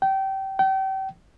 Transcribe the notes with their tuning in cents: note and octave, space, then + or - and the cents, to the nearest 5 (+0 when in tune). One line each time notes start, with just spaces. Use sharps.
G5 -25
G5 -35